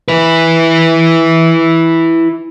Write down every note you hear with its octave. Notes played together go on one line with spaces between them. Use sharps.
E4 B4